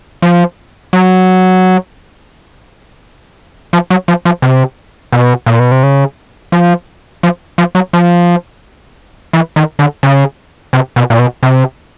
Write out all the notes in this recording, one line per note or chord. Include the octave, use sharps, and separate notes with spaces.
F3
F#3
F3
F#3
F3
F3
C3
B2
A#2
B2
C3
C#3
F3
F3
F3
F#3
F3
E3
D#3
D3
C#3
C3
B2
A#2
B2
C3